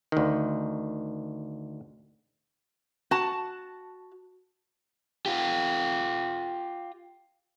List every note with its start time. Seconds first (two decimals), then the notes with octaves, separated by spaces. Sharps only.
0.12 D2 D#3
3.11 F#4 A5
5.26 F4 G4